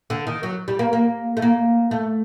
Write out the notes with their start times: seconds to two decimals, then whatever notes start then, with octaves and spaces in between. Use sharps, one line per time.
0.10 D3
0.27 D#3
0.43 F#3
0.68 G3
0.79 A#3
0.93 A#3
1.37 A3
1.42 A#3
1.91 A3